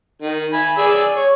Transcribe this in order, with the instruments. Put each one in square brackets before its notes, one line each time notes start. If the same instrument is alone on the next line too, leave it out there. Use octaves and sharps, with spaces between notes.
[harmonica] D#3
G#5 B5
G#4 D5 E6
C#5